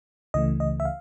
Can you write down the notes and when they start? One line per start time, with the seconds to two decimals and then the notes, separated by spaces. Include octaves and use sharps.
0.34 C#2 C#3 E3 A3 D#5
0.60 D#5
0.80 E5
0.85 F5